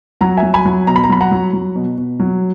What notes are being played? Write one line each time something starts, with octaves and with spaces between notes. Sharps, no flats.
F#3 F#5 A#5
E5 G#5
F#3
G#5 B5
F#3
B2 A#5
B5
A#5
F#3 B5
F#5 A#5
F#3
F#3
B2
B2
F#3